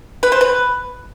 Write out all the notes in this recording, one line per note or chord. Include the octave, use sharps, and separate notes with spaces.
B4
C5
B4